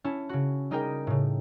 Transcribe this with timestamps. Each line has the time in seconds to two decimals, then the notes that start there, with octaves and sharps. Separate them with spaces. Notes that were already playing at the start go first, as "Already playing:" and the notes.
0.04 C#4 E4 A5
0.29 C#3 F#4
0.71 G3 D#4 G#4 A#4 G5
1.07 A2 C#3